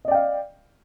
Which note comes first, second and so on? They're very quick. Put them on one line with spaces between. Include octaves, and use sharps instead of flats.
D#5 D5 G5 F5